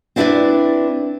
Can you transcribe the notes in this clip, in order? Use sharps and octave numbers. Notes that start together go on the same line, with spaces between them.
C4 D4 E4 A4 B4 D5